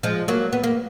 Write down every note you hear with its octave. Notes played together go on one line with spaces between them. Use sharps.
F3 G#3
F#3 A#3
B3
A#3